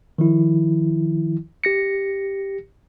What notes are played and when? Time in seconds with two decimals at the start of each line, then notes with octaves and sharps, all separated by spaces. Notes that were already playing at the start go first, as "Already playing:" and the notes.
0.18 D#3 F3 E4
1.64 G4 A#6 C#7